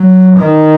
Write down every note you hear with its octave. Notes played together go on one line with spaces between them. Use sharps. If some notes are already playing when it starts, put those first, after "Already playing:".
Already playing: F#3
D#3